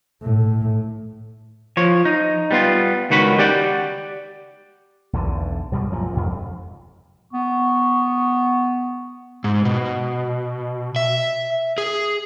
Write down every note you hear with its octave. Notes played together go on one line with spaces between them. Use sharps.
A2
F3 C#5
D#4
G3 B3 F4
C#2 D#3 F#4 B4 B5
G4 D5 F#5 G5
B1 E2 D3
C2 G2 B2 G3
F#2 A#2 F3
F2 G#2 C3
B3 C#6
G#2
B2
E5
G#4